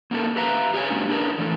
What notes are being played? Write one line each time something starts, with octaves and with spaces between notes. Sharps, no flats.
A#3 C#4 D#4 F#4 A4 A#4
G4 B4 E5 F5 A#5
G4 G#4 C#5 D#5 G#5
F#3 G#3 A#3 C#4 D4 G4
D4 G#4 A#4 B4
E3 A3 E4 A4